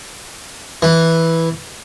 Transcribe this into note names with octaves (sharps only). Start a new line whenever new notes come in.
E3